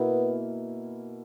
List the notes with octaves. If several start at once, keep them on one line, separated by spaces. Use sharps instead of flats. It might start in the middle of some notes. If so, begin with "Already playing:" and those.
Already playing: B2 A#3 B3 E4